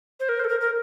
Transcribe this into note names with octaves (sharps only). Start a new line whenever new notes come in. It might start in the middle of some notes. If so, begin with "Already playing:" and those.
C5
A#4
C5
A4
A#4
A#4